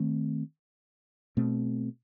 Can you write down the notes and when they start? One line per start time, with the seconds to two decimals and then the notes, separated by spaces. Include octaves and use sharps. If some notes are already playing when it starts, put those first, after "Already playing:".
Already playing: D#3 A3 C4
1.37 B2 A3 C4